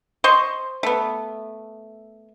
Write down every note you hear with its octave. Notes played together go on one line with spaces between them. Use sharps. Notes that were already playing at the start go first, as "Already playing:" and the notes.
C5 D#5 C6 C#6
A3 B3